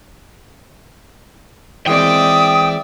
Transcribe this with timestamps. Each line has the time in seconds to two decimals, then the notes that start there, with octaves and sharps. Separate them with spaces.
1.87 E3 G#3 C4 D5 E5 G5 D#6